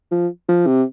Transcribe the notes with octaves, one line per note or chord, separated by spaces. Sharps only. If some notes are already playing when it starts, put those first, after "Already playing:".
F3
F3
C3